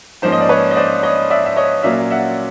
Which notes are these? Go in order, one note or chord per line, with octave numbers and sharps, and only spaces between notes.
G#2 F3 A#3 C#4 C5
D#5
D5
B4 C#5
D#5
C5 D5
C#5 D#5
D5 E5
E5
C#5 D#5
A#2 F#3 A#3 C#4 D5 E5
E5 F#5